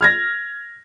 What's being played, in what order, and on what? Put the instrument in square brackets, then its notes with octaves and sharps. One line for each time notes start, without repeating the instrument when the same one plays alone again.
[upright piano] F6 G#6 A#6